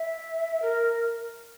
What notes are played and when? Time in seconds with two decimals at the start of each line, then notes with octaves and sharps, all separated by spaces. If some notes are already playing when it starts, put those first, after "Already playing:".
Already playing: E5
0.62 A#4